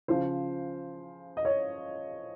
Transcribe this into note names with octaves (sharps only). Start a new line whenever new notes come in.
C#3 F3 C5
D#5
C#5